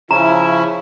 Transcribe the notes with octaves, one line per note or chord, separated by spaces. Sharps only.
C#3 F3 C#4 E4 A#5